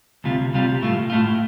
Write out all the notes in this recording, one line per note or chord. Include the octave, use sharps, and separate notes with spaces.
D2 C3 G3 F4
D2 C3 G3 F4
A2 A3 F4
A2 A3 F4